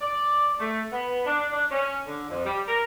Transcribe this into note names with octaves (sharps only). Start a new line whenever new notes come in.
D5
A3
B3
D4
D4
C#4
D3
F2
G3
A#4